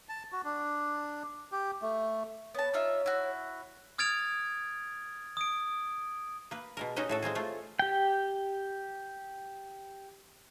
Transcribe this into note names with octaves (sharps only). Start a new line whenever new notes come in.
A5
F#4
D4
G4
A3
B3 C#5 A5
D#4 F4 E5
E4 F#4
D#6 F6 G#6 A6 D7 F7
D#6 D7
A#3 B4
B2 G#3 A#4
G#3 C#4 D#4 F#4 G4 D#5
A2 F#4 A4
G#3 A#3 C4 G#4
A3 F4
G4 G5